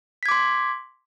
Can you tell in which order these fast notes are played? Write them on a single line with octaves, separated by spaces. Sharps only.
B6 G#6 D6 C6